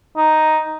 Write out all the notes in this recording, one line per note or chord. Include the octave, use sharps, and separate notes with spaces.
D#4